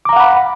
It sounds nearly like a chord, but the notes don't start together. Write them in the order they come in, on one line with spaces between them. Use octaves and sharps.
D6 A#5 F5 F#5 B5